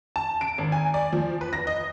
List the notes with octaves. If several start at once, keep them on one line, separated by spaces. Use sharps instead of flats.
A5
D7
G#1
G#5
D5
F3
B4
A#6
D#5